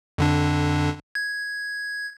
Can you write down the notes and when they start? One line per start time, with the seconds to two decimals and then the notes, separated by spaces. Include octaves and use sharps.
0.18 F2 D3 D4
1.15 G#6